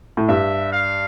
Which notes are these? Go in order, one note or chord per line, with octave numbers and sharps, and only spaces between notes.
A2
G2 E5
F5